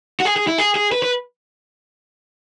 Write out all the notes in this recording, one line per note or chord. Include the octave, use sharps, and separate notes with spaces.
F#4
G#4
G#4
E4
G#4
G#4
B4
B4